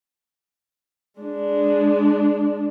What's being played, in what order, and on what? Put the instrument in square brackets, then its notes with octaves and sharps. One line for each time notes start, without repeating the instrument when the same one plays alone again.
[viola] G#3 D4